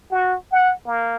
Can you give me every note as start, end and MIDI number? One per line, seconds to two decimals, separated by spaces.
0.11 0.36 66
0.52 0.73 78
0.86 1.16 58